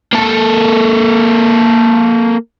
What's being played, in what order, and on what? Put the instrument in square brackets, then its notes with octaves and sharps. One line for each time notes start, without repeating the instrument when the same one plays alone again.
[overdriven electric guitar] A#3 A4